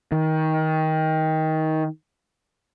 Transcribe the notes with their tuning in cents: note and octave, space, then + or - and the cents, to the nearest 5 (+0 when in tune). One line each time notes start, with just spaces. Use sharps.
D#3 +20